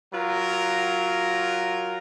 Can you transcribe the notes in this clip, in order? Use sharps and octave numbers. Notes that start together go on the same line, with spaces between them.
F#3 F4 A#4